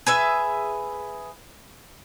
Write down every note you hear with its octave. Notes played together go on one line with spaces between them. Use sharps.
G#4 B4 E5